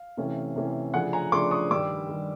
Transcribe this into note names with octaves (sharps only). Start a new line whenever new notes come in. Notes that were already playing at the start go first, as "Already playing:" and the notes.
Already playing: F5
C3 E3 A3 C#4
C3 E3 A3 C#4
C#3 F3 A3 D4 F#5 G#5
G#5 A#5
C#3 F3 A3 D4 C6 D6
C#6 D#6
G2 D#3 G3 D6 E6
D#3 G3